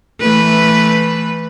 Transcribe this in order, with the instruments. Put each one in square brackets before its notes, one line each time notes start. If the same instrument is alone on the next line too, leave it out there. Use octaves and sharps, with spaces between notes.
[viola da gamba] E3 A3 B4